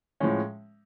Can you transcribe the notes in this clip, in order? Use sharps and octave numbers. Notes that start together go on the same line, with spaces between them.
A2 F3 G#3 C#4